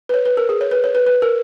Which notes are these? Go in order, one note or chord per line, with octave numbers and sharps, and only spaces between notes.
B4
C#5
B4
A#4
G#4
C#5
B4
C#5
B4
B4
A#4